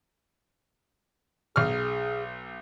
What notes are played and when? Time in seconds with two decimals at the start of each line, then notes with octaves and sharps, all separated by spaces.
1.56 B1 G#4 F6